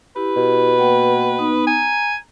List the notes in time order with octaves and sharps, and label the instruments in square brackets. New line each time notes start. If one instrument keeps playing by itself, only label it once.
[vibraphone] E4 G4 [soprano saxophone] B4
[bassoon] B2
[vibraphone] A#3 F#5 G5
B3 D#4 D#6
[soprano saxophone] G#5 [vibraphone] A#5